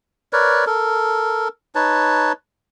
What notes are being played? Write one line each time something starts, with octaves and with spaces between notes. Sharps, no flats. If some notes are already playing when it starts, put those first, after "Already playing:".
A#4 B4 C#5 D5
A4 A#4
D#4 B4 C#5 A5